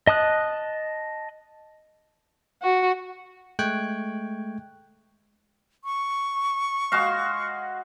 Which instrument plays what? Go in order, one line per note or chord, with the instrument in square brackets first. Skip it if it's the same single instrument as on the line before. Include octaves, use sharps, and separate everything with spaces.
[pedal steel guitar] D#5 A5 D#6 F#6
[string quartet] F#4
[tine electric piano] G#3 A3 G5 C#6 F#6 G#6
[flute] C#6
[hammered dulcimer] G#3 F#4 F5